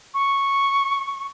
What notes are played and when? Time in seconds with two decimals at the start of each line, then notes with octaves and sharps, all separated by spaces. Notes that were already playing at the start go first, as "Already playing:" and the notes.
0.14 C#6